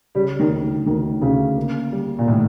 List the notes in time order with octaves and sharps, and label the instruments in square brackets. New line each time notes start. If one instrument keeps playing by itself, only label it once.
[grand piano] C#3 [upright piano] G3
[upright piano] D#3
[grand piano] D2
[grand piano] D2 [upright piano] D#3
[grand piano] D2 [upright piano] C#3
[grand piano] A#3
G3
[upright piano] A#2
[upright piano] A2 [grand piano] D#3